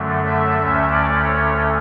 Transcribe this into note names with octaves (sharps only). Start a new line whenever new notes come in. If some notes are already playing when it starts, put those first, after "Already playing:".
Already playing: F#2 D3 F#3 A3
E5
D2 D3 A3 C#4 E5
D5
C#5